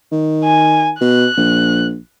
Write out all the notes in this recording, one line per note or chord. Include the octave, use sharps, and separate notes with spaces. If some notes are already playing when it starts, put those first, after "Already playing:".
D#3
G#5
B2 F#6
A#1